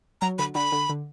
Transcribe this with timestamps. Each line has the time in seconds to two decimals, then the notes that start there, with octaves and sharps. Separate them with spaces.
0.21 F#3 A#5
0.39 D3 B5
0.55 D3 B5
0.72 D3
0.90 D3